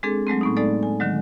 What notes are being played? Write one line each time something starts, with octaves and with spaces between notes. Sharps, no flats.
G#3 C4 D4 G#4 A4
F#3 G#3 A3 C4
A2 B3 D#4
G#3 A3 D#4 A4 D5
G#5
D3 D#3 F#3 G#3